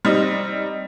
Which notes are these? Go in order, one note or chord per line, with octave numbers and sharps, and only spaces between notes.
G3 C4 D#4 D#5